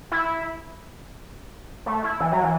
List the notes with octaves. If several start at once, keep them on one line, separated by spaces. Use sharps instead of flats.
E4
A3
E4
E3
F#3
E3